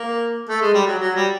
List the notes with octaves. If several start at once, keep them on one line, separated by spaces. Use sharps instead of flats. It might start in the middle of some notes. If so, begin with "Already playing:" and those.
Already playing: A#3
A3
G#3
G3
F#3
F#3
G3